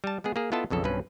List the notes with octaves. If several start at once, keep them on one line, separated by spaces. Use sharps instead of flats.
G3 A5
G#3 B3 G#4
A#3 G#4
B3 E4 F4 A4 D#5 A5
B1 F2 C#3 A4
B1 G2 B2 C4 C#4 B4